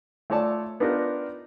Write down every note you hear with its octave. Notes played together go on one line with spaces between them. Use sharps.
A3 F4 C#5 D5 A5 E6
B3 D4 D#4 F4 G4 A#4